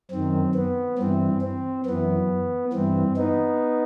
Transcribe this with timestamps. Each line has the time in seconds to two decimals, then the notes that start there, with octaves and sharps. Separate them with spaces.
0.11 F#2 D#3 C4
0.55 B3
0.98 G2 E3 C4
1.42 C4
1.86 F#2 E3 B3
2.73 G2 E3 C4
3.17 B3 D#4